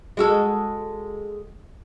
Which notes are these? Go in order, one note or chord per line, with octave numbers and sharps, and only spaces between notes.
G#3 F#4 A4